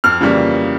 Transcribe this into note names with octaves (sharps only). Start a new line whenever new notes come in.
F2 F6
C#3 E3 G3 A#3